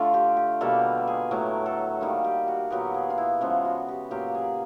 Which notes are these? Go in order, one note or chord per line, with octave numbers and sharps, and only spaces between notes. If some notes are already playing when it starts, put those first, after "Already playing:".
Already playing: D3 A3 F4
G4
G4
B2 G3 A#3 A4
G#4
A2 F#3 A3 A#4
A4
D#3 G3 A#3
G4
F#4
A#2 F#3 B3 G4
G#4
F4
E4
C#3 F3 G#3 B3 F4
F#4
G4
A#2 F#3 A#3 G4
G#4